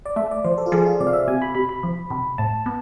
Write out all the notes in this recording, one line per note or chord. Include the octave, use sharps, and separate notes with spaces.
D5
A3 E5
D5
F3 C5
A4
F4
F3 G#4
F4
C3 D5
F5
E5
C3 G#5
B5
C3 B5
B5
F3
C3
A2 A5
B3